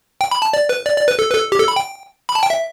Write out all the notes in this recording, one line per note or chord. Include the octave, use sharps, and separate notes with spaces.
G5
B5
A5
D5
B4
D5
D5
B4
A4
B4
A4
G4
A4
B5
G5
B5
A5
G5
E5